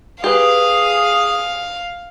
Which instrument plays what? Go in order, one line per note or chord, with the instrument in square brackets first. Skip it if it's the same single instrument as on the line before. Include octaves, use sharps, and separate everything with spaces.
[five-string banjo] G4 B4 [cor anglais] G#4 [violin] F5